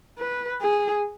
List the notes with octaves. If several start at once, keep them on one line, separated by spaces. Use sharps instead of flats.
B4
G#4